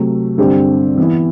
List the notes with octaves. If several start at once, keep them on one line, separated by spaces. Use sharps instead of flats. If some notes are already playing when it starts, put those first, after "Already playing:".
Already playing: C3 F#3 A3
G2 D3 G3 C4 G4
E3 B3 E4